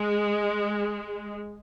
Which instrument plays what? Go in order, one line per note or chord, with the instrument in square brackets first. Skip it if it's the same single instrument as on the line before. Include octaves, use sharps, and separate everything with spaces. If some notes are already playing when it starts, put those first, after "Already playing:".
Already playing: [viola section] G#3